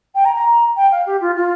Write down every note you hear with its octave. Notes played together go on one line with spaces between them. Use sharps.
G5
A#5
A#5
G5
F5
G4
F4
F4